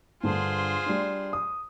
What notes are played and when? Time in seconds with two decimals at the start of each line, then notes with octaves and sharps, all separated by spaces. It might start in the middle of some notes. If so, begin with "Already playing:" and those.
0.23 G2 D3 F4 G#4 C5
0.86 G3 D4
1.33 D#6